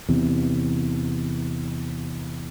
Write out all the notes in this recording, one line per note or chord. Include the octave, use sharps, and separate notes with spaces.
E2 C3